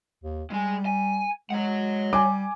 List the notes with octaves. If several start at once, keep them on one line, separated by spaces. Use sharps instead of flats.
D#2
G3 G#3 G#5
G#5
G#3 C#5 F#5
G3 G#5 D6